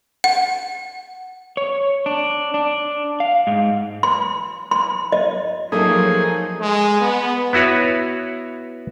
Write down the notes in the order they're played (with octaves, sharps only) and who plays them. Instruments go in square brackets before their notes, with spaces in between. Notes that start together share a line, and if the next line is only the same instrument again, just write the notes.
[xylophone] F#5
[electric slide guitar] C#5
D4
D4
F5
G#2
[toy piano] C6
C6
D#5
[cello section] F3 F#3 [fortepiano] A3 A#3 [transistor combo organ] D#4 G#4
[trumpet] G#3
B3
[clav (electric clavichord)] B3 E4 F#4 B4 C#5